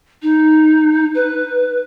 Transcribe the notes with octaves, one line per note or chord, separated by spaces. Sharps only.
D#4
B4